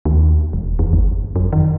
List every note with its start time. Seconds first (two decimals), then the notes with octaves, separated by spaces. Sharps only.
0.05 D#2
0.53 E1
0.79 E2
0.93 G1
1.36 F#2
1.53 D#3